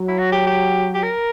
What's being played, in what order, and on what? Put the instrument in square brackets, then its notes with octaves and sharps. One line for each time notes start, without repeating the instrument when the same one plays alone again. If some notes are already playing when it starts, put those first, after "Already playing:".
Already playing: [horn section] F#3
[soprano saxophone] E4
F#4
G4
G4
G4
A#4